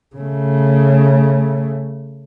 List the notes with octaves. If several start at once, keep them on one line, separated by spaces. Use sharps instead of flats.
C#3 A3